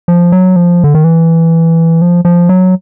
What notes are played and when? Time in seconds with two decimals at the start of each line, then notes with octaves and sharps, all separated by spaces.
0.08 F3
0.32 F#3
0.56 F3
0.84 D3
0.95 D#3
1.04 E3
2.02 F3
2.25 F3
2.49 F#3